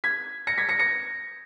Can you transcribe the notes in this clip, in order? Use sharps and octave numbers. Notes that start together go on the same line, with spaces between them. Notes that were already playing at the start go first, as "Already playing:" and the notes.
G#6 B6
A#6 C#7
G#6 B6
A#6 C#7
A#6 C#7